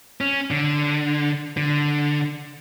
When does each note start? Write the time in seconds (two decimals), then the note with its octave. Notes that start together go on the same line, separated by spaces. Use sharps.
0.21 C#4
0.51 D3
1.57 D3